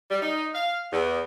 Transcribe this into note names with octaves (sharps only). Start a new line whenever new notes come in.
G3
D#4
F5
E2